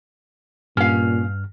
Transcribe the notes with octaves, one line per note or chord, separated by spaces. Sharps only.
G2 A#2 C#4 F5 F6